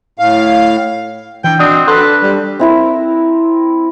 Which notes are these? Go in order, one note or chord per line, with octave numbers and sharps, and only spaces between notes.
A2 F5
E3 D4 G5
C4 D4 F#4 D#5
F#4 A4 B4 C5
D4
G3
C4 E4 A#4